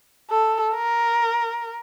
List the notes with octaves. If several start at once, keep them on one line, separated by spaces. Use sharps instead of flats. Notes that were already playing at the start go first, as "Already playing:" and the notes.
A4
A#4